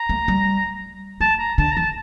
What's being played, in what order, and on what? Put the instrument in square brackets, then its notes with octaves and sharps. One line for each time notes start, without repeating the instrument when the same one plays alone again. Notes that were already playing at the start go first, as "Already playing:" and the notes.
Already playing: [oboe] A#5
[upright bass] A3
G3
[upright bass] A3 [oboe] A5
[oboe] A#5
[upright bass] D3 [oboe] A5
[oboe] A#5
[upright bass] E3 [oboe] A5